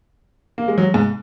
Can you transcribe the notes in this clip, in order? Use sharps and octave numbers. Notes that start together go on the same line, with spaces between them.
A#3
G#3
F#3
G#2